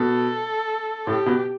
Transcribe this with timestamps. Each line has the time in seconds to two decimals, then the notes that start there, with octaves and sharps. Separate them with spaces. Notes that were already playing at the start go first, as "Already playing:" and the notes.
Already playing: B2 A4
1.06 A2 G4
1.26 B2